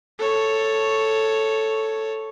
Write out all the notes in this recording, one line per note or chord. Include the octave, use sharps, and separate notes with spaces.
A4 C#5